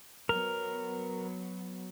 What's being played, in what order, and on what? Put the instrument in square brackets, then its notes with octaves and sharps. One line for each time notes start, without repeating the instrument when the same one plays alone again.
[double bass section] F#3 B3 [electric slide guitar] A#4